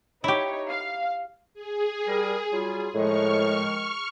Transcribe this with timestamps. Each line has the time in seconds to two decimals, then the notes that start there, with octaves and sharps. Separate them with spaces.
0.24 D#4 E4 G4 C#5
0.69 F5
1.54 G#4
2.08 G3 A#4
2.53 F#3 G3 F4
2.95 A2 D#3 F3 G#3 C#6 F6